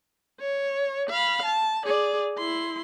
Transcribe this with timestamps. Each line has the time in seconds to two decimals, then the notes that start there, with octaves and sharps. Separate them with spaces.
0.40 C#5
1.09 F5 B5
1.45 A5
1.85 G#4 D5
2.38 E4 C6